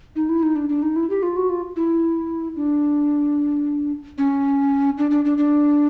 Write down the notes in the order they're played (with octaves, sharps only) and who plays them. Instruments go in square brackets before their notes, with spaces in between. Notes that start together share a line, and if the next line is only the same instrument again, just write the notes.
[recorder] D#4
E4
D#4
D4
D4
D#4
E4
G4
F4
F#4
F4
E4
D4
C#4
D4
D4
D4
D4